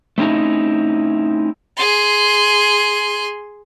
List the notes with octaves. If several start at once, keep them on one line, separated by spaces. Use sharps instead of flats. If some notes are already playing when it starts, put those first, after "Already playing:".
A3 C4 C#4 D#4 E4
G#4 C6